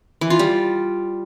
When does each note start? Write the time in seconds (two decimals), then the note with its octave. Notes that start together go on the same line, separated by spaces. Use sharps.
0.21 E3
0.30 F4
0.39 G3